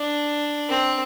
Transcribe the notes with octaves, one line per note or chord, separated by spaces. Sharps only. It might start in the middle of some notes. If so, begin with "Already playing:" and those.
Already playing: D4
C4